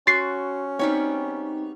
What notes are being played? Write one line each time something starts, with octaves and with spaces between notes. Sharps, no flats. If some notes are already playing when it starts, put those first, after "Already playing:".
C#4 F#4 C6 A6 C7
G3 B3 C4 D#4 C#5